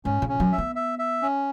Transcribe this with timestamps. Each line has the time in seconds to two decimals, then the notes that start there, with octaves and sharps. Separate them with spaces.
0.05 G#2 C#4
0.22 C#3
0.29 C#4
0.40 F#3
0.52 E5
0.58 B3
0.75 E5
0.99 E5
1.22 C#4